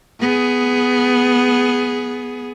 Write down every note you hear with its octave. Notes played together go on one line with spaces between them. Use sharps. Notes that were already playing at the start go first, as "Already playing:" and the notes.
B3 G#4